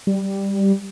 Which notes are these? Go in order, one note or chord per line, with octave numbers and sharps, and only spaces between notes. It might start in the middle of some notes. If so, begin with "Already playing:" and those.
G3